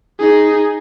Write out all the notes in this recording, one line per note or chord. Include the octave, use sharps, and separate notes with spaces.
D#4 G#4